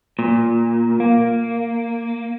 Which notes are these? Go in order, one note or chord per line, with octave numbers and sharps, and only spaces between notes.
A#2
A#3